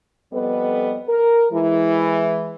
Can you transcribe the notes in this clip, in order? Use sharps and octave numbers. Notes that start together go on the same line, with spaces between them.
F2 G3 B3 A4 B4 D#5
A#4
E3 G#3 E4